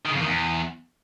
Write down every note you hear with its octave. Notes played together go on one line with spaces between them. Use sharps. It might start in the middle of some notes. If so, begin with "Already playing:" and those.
D#3
C#3
F2
D#3
E2